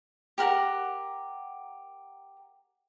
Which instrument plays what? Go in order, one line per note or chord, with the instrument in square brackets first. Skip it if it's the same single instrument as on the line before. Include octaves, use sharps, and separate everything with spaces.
[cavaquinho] G4 A#4 F#5